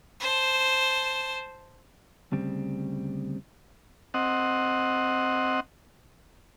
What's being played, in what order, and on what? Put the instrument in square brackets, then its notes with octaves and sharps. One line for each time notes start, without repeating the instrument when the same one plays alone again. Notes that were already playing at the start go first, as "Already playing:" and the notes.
[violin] C5 A5
[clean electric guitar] D2 C#3 G3 C4
[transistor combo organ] C4 D#5 F#5